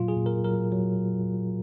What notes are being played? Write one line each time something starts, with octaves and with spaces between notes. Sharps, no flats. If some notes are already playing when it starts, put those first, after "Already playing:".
Already playing: A#2 F#3 F4
G#4
A#2
A#4
F#3 A#4
F#3